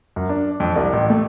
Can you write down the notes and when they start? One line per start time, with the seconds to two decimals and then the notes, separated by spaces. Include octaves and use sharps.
0.16 F#2
0.29 D4
0.60 F2
0.76 C2
0.93 A1
1.10 A3